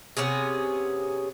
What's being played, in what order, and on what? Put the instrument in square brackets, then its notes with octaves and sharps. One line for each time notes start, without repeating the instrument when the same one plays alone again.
[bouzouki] C3 B3 C#4 G#4